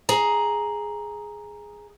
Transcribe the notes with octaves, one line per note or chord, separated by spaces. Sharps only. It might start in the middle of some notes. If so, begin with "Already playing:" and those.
G#4 A#5